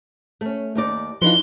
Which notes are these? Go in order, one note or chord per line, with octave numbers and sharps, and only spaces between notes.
A3 C#4
D#2 D#4 D5
E3 F3 D4 D#4 F4 G7